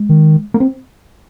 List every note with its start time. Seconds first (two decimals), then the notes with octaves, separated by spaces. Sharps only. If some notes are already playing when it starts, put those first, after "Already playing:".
Already playing: G#3
0.09 D#3
0.54 A#3
0.60 C4